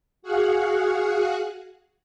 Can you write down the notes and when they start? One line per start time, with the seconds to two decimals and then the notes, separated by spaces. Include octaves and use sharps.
0.22 F#4 G#4 F5 F#5